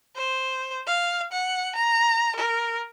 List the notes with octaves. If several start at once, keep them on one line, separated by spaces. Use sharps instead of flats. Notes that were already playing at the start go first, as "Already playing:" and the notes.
C5
F5
F#5
A#5
A#4